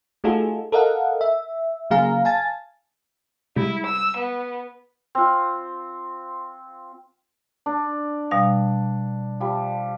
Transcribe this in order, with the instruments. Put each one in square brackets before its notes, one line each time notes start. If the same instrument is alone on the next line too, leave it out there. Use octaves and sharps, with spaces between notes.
[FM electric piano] A3 D#4 F4 F#4 G#4 A4
A4 A#4 D#5 F5 F#5
E5
C#3 F#3 A#3 G#4 F5 A#5
F5 G#5 A5 A6
[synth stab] C3 G3 G#3 [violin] E4
[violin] E6
B3
[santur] C4 F4
[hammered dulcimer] D4
[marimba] B2 G3 F5
[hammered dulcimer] F3 G3